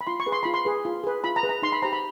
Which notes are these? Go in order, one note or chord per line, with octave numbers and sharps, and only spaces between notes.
B5
F4 C6
C#6
G#4 B4
C6
F4 B5
C6
G#4 B4
F4
G#4 B4
F4 B5
A#5
G#4 B4
A#5
D#4 C6
B5
G4 C5 A#5
B5